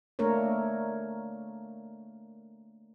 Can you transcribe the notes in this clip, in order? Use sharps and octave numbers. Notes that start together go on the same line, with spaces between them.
A3 A#3 D4 A#4 C#5